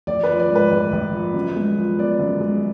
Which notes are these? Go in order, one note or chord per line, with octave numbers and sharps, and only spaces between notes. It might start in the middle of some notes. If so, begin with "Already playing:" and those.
A#1 D5
B4
F3
D5
G#2
B4
A#1
A#1
F3
F#2
G#3
F3
B3 D5
F#2
G#3